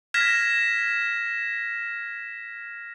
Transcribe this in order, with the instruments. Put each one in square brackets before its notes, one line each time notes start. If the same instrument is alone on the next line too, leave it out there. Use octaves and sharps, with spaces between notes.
[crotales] F6 G#6 A#6 B6 E7